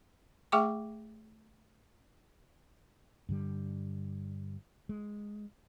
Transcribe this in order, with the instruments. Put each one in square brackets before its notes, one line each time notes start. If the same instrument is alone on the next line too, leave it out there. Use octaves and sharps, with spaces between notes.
[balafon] A3 G#4 E5 G5 C#6 D6
[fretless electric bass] G2 D3 G3
G#3